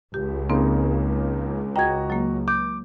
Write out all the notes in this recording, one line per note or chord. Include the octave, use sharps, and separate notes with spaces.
C#2 G4
C#3 A#3 C4 D#4
F#4 D#5 G5 A#5 G#6
F#3 A#3
D6 G6